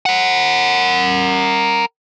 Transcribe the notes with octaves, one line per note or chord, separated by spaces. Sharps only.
A#4 F#5